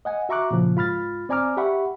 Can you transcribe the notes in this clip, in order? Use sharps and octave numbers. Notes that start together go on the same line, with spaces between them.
D#5 F#5 G#5
F#4 E5 A#5 C#6 D6 F#6
A#2 C#3 F3
G#2 F4 B5 F6 A6
C4 D5 G#5 A#5 D6 F6
G4 E5 F#5 B5 C#6